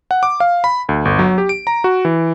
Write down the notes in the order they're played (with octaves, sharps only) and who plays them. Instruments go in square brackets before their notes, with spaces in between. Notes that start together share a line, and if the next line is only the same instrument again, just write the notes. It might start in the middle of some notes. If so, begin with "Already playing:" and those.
[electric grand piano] F#5
D6
F5
B5
D2
G1
F#3
G4
D7
A#5
F#4
E3